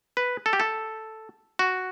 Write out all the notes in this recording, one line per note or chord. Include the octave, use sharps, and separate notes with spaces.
B4
A4
G4
A4
F#4